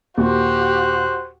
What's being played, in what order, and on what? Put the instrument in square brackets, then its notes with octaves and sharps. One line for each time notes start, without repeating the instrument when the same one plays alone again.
[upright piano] D#2 A#2 [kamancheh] F#4 G4 [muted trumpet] C5 [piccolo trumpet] F#6